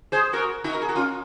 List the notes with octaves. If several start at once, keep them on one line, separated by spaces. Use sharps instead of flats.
G#4 C5
F#4 A#4
D#4 F#4
A#4
G#4
F#4
C#4 F4